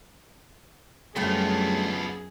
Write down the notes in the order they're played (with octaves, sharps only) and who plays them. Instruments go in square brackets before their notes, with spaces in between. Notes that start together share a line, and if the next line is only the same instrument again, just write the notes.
[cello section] F#2 [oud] D3 G3 A3 [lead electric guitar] B3 F4 [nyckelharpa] G#4